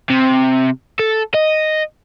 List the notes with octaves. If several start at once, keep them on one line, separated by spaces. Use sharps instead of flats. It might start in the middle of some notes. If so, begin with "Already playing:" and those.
C3
A4
D#5